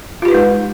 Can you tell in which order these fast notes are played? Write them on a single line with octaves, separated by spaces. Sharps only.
F4 G4 B4 D#4 G#3